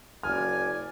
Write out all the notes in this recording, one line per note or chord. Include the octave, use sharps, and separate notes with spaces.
F#1 D5 G#5 F6